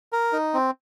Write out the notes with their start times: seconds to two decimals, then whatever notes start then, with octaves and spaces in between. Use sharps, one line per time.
0.13 A#4
0.33 D#4
0.54 C4